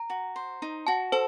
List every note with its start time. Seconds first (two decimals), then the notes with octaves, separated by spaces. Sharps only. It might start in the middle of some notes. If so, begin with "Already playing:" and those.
Already playing: A#5
0.10 F#4
0.36 C5
0.62 D#4
0.87 F#4 A5
1.12 A4 C5